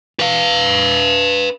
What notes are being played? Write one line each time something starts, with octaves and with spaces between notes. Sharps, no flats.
B4 F5